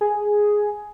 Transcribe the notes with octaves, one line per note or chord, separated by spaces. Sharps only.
G#4